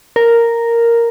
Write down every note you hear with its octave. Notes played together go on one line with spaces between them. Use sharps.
A#4